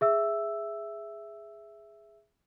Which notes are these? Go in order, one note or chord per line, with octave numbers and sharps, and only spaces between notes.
G#4 E5 E6